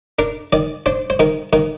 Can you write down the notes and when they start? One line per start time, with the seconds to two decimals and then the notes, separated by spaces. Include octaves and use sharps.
0.19 D4 A#4
0.53 D#3 D5
0.86 D4 C5
1.10 C5
1.19 D#3 A#4
1.53 D#3 A#4